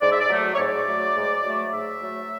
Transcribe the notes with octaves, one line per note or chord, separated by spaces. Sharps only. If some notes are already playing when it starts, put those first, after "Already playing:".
G#2 D5
E5
D5
F#3 A3
C#5
G#2 D5
F#3 A3
G#2
F#3 A3
G#2 E5
F#3 A3